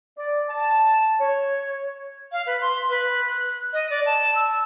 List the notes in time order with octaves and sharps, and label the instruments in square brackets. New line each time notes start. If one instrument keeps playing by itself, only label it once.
[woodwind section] D5
A5
C#5
[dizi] F5
B4
C6
B4
F#6
D#5
D5
A5
E6